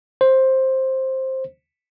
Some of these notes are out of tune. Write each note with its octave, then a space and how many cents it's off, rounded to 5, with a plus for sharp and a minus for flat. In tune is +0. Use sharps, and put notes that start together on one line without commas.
C5 +10